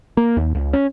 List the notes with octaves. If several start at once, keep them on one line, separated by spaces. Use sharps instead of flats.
A#3
D#2
C#2
C#4